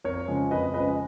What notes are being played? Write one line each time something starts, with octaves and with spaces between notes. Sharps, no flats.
F2 A#4 C#5
C#3 F3 G#3
F2 B4 D#5
C#3 F3 G#3 B4 D#5